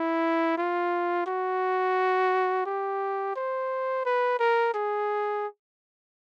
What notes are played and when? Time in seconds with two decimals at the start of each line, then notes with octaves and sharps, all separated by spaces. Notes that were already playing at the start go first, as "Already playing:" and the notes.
Already playing: E4
0.58 F4
1.26 F#4
2.66 G4
3.36 C5
4.05 B4
4.40 A#4
4.74 G#4